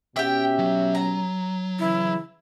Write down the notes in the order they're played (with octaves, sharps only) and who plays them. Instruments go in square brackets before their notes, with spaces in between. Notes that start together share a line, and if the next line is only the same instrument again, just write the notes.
[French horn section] B2 C#4 [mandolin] G4 E5 [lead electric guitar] G5
[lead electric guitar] F#3
[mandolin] A#5
[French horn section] C#3 E3 [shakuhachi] E4